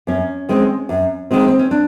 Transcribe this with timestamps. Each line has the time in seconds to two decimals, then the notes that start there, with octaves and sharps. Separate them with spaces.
0.07 F#2 C#4
0.49 D#3 G#3 C4
0.89 F#2
1.31 D#3 G#3 C4
1.47 C4
1.59 C#4
1.71 D4